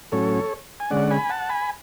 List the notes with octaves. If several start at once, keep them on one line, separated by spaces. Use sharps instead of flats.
A2 F#3 C#4 A4 C#5
G#5
D3 G#3 C#4 D5 F#5
G#5 B5
F#5 A5
G#5 B5